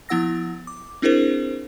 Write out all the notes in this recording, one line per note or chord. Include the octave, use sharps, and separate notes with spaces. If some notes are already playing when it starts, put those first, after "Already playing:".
F3 B3 E4 F#5 E6 A#6
D6
C4 D4 E4 G#4 A#4 C5